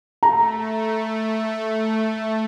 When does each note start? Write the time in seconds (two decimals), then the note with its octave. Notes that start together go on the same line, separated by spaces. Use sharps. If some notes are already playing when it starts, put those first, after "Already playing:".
0.23 A3 A#5